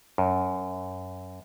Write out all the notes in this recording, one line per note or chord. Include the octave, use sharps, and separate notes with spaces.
F#2